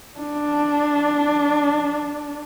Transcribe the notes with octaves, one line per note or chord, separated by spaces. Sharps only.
D4